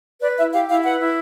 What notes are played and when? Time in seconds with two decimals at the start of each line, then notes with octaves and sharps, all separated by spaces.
0.22 B4 D5
0.37 E4 E5
0.53 G4 F5
0.69 E4 F5
0.84 B4 F#5
0.99 E4